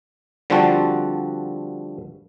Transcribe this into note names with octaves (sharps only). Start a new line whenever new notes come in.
D3 F3 G3 C4 F#4 A5